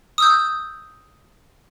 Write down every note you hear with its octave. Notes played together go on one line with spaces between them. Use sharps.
D#6 E6 G6